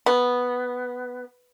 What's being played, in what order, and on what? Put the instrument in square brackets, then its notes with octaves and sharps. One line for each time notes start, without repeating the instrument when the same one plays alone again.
[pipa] B3